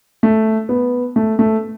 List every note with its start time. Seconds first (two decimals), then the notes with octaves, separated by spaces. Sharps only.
0.23 A3
0.69 B3
1.16 A3
1.39 A3